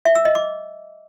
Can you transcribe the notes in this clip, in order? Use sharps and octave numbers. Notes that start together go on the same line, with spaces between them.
E5
E6
D#5
D6